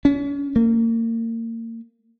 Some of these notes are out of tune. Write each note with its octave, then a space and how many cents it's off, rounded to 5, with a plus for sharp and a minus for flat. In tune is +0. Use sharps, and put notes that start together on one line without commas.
C#4 +35
A#3 -35